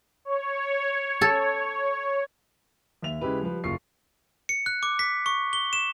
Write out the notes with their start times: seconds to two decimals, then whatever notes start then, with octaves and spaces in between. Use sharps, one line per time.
0.25 C#5
1.21 A4
3.03 D#2 E5 F7
3.21 C#3 G#3 E4 G4 B4
3.41 F3 G3 B4
3.64 F#1 F4 C#6 C7
4.49 C#7
4.66 F#6
4.83 D6
4.99 B6
5.26 C#6
5.53 G7
5.73 E7